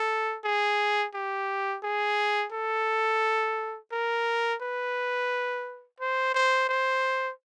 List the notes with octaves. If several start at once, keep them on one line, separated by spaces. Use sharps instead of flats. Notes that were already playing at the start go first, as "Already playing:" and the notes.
Already playing: A4
G#4
G4
G#4
A4
A#4
B4
C5
C5
C5